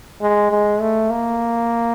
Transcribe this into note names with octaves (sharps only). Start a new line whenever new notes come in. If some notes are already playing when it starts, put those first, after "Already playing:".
G#3
G#3
A3
A#3